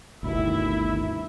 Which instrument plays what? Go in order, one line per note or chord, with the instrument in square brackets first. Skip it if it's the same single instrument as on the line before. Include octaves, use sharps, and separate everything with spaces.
[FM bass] G1 [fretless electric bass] D2 B2 D#3 [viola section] E4 E5